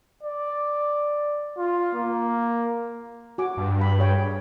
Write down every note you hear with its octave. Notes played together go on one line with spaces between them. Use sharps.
D5
F4
A#3
F#4 G#5 D6
G2
B5
G#4 C#5 G5